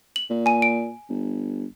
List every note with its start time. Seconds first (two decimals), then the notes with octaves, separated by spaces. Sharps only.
0.16 F#7
0.30 A#2
0.46 G#5 D#7
0.62 D7
1.09 G1